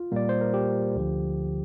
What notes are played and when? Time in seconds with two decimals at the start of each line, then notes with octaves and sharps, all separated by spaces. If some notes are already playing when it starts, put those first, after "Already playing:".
Already playing: F4
0.12 A#2 G3 A#3 D5
0.29 C5
0.41 A#4
0.54 G4
0.95 D2 D3 F3